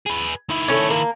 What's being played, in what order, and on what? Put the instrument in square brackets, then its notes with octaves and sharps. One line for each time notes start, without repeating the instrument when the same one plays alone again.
[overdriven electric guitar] G#4 B4
D#3 E4
[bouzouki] A3 C#4
A#3